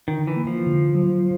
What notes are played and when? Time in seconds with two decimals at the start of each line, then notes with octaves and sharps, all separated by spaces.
0.08 D3 D#3
0.27 E3
0.36 A#3
0.47 F3
0.67 D3
0.95 F#3